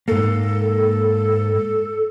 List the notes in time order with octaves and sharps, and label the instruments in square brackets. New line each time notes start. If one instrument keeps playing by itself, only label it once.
[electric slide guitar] G#2 A#3 [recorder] A4